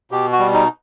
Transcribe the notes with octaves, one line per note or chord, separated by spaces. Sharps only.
B2 G4
F#4
G3
D#4